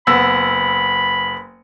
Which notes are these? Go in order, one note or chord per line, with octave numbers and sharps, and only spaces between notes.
F#1 B3 B5 E6